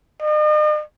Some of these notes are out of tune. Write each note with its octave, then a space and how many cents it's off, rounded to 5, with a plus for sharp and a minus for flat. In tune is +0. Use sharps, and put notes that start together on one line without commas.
D#5 -45